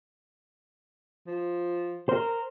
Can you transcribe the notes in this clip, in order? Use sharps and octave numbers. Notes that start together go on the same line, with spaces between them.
F3
A#4 C5